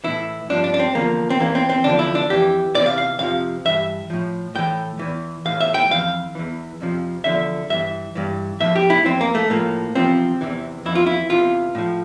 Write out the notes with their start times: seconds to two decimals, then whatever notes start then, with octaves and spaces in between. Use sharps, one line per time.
0.04 A2 E3 E4
0.49 G2 F3 D4
0.64 D4
0.74 D4
0.80 C4
0.95 E2 D3 F3 A#3
1.30 C4
1.40 E2 E3 A#3
1.55 C4
1.70 C4
1.84 E2 D3 F3 D4
1.99 E4
2.15 D4
2.30 F2 E3 G4
2.75 E2 C3 E3 D5
2.86 F5
2.98 F5
3.19 F2 C3 F3 F5
3.65 G2 E3 E5
4.10 A2 F3
4.55 A2 E3 G5
4.99 E2 E3
5.45 A2 E3 F5
5.61 E5
5.74 G5
5.90 F2 E3 F5
6.35 E2 E3
6.81 F2 C3 F3
7.24 E2 D3 F3 E5
7.70 G2 E3 E5
8.15 G2 E3
8.60 A2 F3 E5
8.76 G4
8.90 E4
9.05 F2 E3 C4
9.21 A#3
9.35 A3
9.50 A2 F3 A#3
9.95 E2 C3 F3 C4
10.41 E2 C3 E3
10.85 F2 E3 E4
10.95 F4
11.06 E4
11.30 E2 C3 E3 F4
11.75 A2 F3